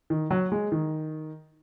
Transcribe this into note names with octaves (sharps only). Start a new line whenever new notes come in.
D#3
F#3
G#3
D#3